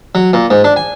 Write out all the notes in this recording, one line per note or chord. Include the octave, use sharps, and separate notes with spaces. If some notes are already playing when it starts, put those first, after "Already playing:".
F#3
A#2
G#2
D4
G#5